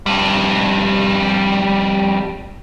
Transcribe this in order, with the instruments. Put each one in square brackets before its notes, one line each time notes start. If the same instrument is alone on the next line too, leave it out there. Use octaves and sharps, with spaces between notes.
[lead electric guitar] F2 G3